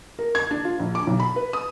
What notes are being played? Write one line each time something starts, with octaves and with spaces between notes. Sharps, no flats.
A#4
G#6
D4
F4
A#1
D6
B1
B5
B4
D#6